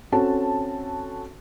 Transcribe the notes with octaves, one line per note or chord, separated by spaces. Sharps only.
C4 C#4 F#4 A4 A5